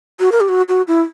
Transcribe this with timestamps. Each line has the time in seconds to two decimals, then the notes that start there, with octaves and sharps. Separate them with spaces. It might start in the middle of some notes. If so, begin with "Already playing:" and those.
0.20 F#4
0.32 A#4
0.40 G4
0.49 F#4
0.69 F#4
0.88 E4